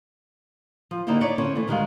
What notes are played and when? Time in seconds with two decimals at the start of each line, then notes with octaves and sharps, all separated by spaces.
0.91 F3
1.07 D3 A#3 D#4 E4 G4 C5
1.20 D#4 E4 C#5 D5
1.38 D3 C#4 E4 C5
1.55 E3 A3
1.67 D2 D#3 G3 G#3 G#4 F5